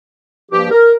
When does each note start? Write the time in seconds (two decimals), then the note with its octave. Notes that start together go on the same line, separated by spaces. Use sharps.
0.51 G2 F3 A#3 G4
0.71 A#4